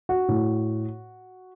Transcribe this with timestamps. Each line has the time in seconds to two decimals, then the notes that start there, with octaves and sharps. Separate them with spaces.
0.09 F#4
0.28 A2